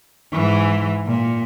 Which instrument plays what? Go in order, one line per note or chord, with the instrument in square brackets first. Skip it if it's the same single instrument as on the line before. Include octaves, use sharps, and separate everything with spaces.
[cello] G#2 E3
A#2